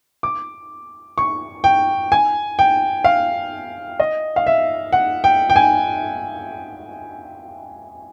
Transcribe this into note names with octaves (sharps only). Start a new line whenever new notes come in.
D6
C#6
G5
G#5
G5
F5
D#5
F5
E5
F#5
G5
G5
G#5